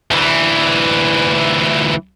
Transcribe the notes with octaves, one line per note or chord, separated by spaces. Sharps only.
D2 E3